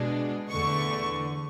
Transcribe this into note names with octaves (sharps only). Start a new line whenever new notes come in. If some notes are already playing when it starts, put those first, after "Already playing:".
Already playing: B2 G#3 D4
E2 D3 A3 C#6